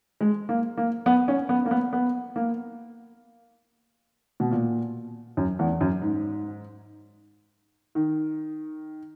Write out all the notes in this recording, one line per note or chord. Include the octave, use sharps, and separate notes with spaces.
G#3
A#3
A#3
B3
C#4
B3
A#3
B3
B3
A#3
B2
A#2
F#2
E2
F#2
G#2
D#3